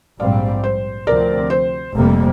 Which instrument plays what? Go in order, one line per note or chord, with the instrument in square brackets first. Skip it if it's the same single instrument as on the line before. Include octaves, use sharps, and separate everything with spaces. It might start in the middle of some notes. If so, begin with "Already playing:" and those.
[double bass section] A#1 G#2 G3 C4 [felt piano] D5 F5
[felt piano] C5
[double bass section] D2 C3 F3 C4 [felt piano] A#4 D5
[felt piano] C5
[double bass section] F1 F2 C3 G3 A#3